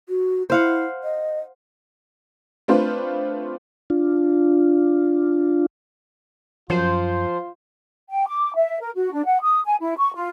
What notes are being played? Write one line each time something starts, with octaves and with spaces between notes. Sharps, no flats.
F#4
E4 C5 F5 F#5
D#5
A3 C4 D4 F4 B4 C5
D4 F4
F#2 F3 F4 C5
G5
D6
E5
A#4
F#4
D4
F#5
D#6
G#5
E4
C#6
F4